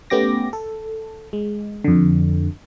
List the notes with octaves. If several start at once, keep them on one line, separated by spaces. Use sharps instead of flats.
A3 B3 C#4 G4 D6 A#6
A4
G#3
F2 D3